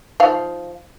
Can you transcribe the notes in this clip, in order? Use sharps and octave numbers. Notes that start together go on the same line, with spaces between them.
F3 D#4 F5